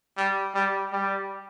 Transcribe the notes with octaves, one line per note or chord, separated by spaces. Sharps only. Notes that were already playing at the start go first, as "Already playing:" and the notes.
G3
G3
G3